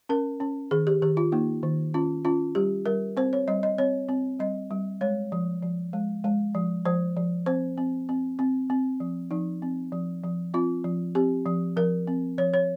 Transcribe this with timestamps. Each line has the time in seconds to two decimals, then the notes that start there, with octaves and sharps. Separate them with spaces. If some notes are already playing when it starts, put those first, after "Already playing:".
0.09 C#4 A#4
0.40 C#4
0.71 D#3 G#4
0.87 G4
1.02 D#3 G4
1.17 F4
1.32 A#3 D#4
1.63 D#3
1.94 C#4 F4
2.25 C#4 F4
2.55 G3 G4
2.86 G3 A#4
3.17 C4 C5
3.33 C#5
3.48 G3 D#5
3.63 D#5
3.78 C4 C#5
4.09 C4
4.39 G3 D#5
4.71 G3
5.01 G#3 C#5
5.32 F3
5.63 F3
5.93 G#3
6.24 G#3
6.55 F3
6.85 F3 C5
7.17 F3
7.46 C4 C5
7.78 C4
8.09 C4
8.39 C4
8.70 C4
9.00 F3
9.31 F3 D#4
9.62 C4
9.92 F3
10.24 F3
10.54 C4 F4
10.84 F3
11.15 C4 G4
11.46 F3
11.77 F3 A#4
12.07 C4
12.38 F3 C#5
12.54 C#5